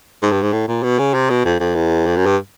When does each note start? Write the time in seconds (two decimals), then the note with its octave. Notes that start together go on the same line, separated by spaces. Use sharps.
0.23 G#2
0.32 G2
0.42 G#2
0.53 A2
0.68 A#2
0.83 B2
0.99 C#3
1.14 C3
1.30 B2
1.45 F2
1.60 F2
1.75 E2
2.06 F2
2.16 F#2
2.26 G2